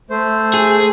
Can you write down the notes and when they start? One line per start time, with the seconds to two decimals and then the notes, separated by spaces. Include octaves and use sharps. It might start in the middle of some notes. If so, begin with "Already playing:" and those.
0.10 A3 C5
0.54 G#4